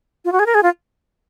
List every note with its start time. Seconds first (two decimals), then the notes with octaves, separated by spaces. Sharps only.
0.25 F4
0.32 F#4
0.39 G#4
0.46 A#4
0.54 G#4
0.63 F4